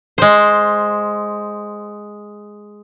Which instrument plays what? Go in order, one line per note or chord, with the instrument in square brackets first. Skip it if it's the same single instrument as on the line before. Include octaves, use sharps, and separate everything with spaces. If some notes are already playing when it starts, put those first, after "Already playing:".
[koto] G#3 C5